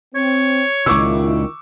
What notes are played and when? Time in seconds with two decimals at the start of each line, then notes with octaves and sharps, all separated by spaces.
0.15 C4 C#5
0.86 C#2 A#2 D#3 E4 F4 C#6 D6 E6